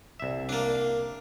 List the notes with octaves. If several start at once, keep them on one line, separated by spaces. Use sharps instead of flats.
C2 E5
A#3 D4